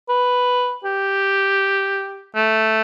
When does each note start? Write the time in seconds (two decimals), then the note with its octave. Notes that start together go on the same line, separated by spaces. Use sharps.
0.09 B4
0.85 G4
2.36 A3